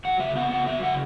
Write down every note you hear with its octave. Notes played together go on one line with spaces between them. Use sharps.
F#3 F#5
C#3 E5
B3 F#5
C#3 F#5
F#3 E5
C#3 F#5